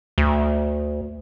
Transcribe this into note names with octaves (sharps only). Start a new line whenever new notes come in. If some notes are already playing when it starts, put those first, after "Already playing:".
D2